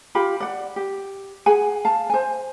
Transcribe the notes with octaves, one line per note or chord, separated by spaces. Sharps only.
F4 G4 B5
D5 F#5
G4
G#4 F#5 G#5
F5 A5
C5 G#5